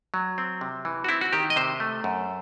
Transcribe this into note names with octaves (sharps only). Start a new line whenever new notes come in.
F#3
C4
C3
E3
F#4
C4 E4
F#4
D#3 G4
D#5
C3 C5
A3
F#2